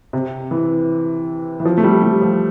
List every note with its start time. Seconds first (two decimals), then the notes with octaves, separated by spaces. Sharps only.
0.13 C3
0.51 E3
1.60 E3
1.65 F3
1.77 A3
1.84 G3
2.02 G3
2.22 F3